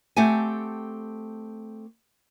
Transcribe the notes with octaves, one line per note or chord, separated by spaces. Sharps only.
A3 C4 G4 A4 F#5 G#5